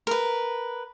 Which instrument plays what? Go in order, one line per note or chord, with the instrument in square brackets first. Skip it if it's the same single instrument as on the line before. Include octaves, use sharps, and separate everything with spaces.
[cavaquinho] A#4 B4